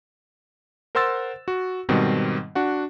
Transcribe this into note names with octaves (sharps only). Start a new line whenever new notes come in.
A#4 C5 F#5 C6 E6 A6
F#4
G#2 B2 D#3 G3 C4
D4 F#4 F#5